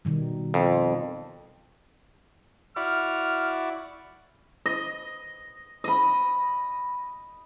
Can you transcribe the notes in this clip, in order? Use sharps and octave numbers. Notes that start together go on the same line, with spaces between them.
B2 D#3 G3
F2
E4 F#4 D5 F6
D#5
D#5 B5